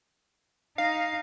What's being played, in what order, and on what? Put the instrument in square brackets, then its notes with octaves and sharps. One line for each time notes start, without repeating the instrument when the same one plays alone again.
[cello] D#4 [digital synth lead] F5